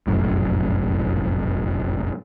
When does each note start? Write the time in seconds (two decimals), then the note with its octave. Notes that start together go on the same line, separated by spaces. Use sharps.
0.07 F1 A#1 F#2 A2